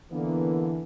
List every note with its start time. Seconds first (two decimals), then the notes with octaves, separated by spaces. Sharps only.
0.12 D3 E3 A#3 B3